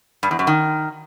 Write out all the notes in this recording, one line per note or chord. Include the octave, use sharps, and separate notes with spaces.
G2
E2
F#2
D#3